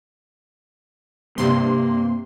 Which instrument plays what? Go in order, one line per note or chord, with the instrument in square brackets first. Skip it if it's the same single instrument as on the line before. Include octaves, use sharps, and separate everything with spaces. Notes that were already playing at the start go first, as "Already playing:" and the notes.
[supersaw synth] G2 C3 C6 [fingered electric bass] A#3